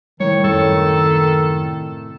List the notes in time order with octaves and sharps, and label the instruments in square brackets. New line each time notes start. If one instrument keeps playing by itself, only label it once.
[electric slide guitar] A2 C3 E4 [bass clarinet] D#3 [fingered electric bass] G3 [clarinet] C#5
[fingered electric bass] F#2 [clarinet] A4